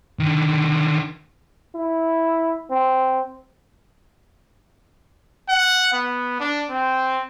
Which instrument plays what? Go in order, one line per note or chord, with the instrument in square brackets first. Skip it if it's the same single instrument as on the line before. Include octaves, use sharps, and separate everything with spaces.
[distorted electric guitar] D3 D#3
[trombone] E4
C4
[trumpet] F#5
B3
D4
C4